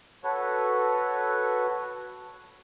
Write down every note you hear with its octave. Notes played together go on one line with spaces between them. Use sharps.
F#4 A4 B4 C#5